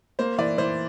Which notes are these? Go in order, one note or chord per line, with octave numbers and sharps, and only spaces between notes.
A#3 C5
E3 D5
E3 C5